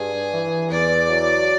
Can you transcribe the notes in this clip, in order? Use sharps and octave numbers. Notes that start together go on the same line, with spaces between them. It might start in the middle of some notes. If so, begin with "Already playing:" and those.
Already playing: G2 G#4
E3
E2 D5
F#3